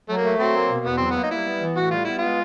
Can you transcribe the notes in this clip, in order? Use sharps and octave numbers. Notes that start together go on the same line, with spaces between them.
F#3 A3
A#3
A3
F#3 C4
A#3
B2
E2 B3
F#3 C4
A#3 B3
D#4
G3 E4
B3
E3
A2 F#4
G3 F4
B3 E4
G#3 F4